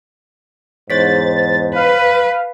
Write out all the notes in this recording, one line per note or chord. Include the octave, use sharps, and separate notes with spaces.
E2 G#2 C5 C#5 A6 B6
B4 F5